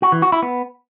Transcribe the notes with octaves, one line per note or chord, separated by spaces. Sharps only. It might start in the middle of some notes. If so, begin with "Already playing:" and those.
F#4
E3
F#4
E4
B3